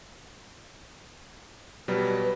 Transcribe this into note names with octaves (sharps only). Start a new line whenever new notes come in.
B2 F#3 G3 B4